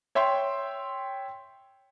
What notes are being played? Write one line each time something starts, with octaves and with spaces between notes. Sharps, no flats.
C#5 E5 G5 C6